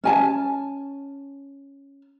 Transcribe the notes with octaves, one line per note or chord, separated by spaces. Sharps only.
C#4 G#5 A5